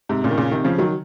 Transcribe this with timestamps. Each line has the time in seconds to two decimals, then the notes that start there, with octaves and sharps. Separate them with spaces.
0.09 G#2 C3
0.24 A#2 C#3
0.31 D#3
0.38 A#2 C#3
0.51 C3 D#3
0.64 C#3 F3
0.78 D#3 F#3